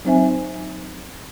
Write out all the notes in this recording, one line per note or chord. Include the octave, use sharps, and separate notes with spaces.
F#3 C4 D#4 C5 E5 G#5